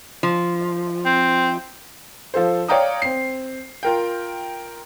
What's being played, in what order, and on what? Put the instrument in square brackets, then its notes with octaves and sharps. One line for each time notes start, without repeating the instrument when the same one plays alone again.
[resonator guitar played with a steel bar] F3
[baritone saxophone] C4
[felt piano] F3 A4 C5
C#5 D5 F5 G5 A#5 D#6
C4 C7
F4 A#4 G5